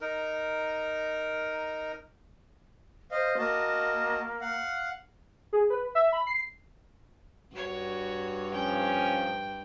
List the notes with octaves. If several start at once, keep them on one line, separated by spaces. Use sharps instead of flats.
D#4 A#4
C5 D#5 F5
A#3 F#4 D#5 A5
F5 F#5
G#4
B4
E5
B5
C7
G2 F#4 C#5
F3 C#4 G5